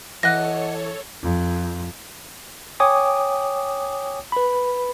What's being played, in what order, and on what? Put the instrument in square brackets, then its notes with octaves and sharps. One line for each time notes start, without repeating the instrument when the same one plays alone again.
[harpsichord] E3 [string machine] A4 C#5 [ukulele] D#5 F#5 [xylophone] F#6 A#6
[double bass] F2
[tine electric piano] C#5 G5 G#5 D6 D#6
B4 B5